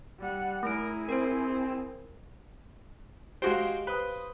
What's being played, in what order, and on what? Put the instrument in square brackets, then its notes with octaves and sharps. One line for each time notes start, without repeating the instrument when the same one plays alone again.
[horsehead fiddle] G3 F#5
[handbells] A3 D7 [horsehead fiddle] E4 G#4 [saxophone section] A#4
[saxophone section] C4 [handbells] A#4 C5
[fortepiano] G#3 F#4 C5 [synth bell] G4 F5
[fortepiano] B4 [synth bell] C5 D#6